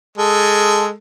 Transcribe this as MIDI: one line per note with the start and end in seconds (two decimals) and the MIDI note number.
0.18 0.92 56
0.18 0.92 69